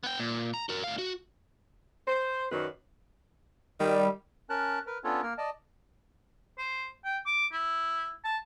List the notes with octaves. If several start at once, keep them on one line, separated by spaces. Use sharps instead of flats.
B3 G5
A#2
A#5
F#4 A#4
A2 F5
F#4
C5
F#2 D#3 F#3 B4 D5
D#3 G3
C#4 A#4 A5 F#6
A#4 B4
B3 C#4 D4 F4 A4 C#5
A#3 A#4
D5 D#5 A5
C5
G5
D6
E4
A5